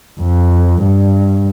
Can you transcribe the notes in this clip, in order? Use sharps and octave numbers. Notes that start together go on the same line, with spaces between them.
F2
G2